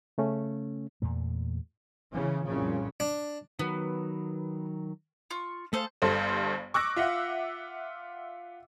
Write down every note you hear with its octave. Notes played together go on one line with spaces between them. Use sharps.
C#3 A3 C#4
E2 A#2 A3
C#3 E3 C#4
C2 F#2 A#2 C#3 F3
D4
D#3 F#3 B3
F4 C#6
A3 G#4 A4 C5 F5
G1 G2 A4 C5
C#6 D6 E6 F#6 A#6
F4 E5 F#5